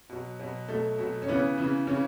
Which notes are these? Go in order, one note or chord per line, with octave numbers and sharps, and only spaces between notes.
B2 F#3
B2 F#3
B2 F#3 A3
B2 F#3
C#4
C#3 E3 B3
C#3 E3
C#3 E3 C#4